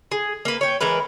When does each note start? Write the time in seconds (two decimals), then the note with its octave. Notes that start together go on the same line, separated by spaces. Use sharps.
0.12 G#4
0.45 A#3 B4
0.61 C#5 G5
0.81 E3 G#3 A#4 B4